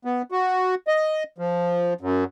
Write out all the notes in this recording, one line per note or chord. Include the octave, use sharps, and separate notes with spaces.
B3
F#4
D#5
F3
F#2